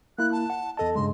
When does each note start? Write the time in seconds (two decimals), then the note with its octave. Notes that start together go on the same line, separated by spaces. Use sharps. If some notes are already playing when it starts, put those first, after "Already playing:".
0.18 A#3 E4 F#6
0.32 A5
0.50 F#5
0.77 E2 A4 D#5 A5
0.95 G2 C#3 G#3 C6